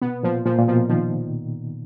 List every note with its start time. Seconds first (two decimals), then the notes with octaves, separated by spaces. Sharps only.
0.02 B2 B3
0.23 A#2 F3
0.46 A#2 F3
0.58 A#2
0.68 B2 F3
0.89 D#3 F3